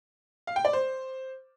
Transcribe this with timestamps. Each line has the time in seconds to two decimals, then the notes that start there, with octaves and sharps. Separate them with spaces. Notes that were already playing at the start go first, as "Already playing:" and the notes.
0.47 F5
0.56 G5
0.65 D5
0.73 C5